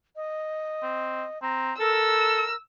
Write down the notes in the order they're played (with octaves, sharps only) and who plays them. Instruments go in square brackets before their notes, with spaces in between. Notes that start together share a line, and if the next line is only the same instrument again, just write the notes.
[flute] D#5
[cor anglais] C4
[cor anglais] C4 [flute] A#5
[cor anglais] A4 [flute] A#4 [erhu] E6